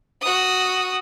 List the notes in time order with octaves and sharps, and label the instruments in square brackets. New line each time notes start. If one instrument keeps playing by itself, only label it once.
[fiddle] F#4 D#6